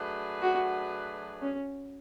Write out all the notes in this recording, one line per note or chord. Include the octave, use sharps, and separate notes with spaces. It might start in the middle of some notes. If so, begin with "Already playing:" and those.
Already playing: F#3 A3 D4 G#4 B4
F#4
C#4